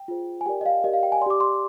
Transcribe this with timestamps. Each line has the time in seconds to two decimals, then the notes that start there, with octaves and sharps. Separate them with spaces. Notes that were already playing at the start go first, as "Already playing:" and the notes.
Already playing: G5
0.08 F4 G#4 C5
0.41 G#5
0.46 G4 A#4 D5 G5
0.61 D#5
0.66 F5
0.84 G4 A#4 D5 D#5
0.93 F5
1.03 G5
1.12 G#5
1.21 D5 C6
1.26 G4 D6
1.40 C6